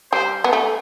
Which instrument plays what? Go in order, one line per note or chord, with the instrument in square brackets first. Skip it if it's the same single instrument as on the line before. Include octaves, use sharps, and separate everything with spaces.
[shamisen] G3 [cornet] C5
[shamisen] B3
A3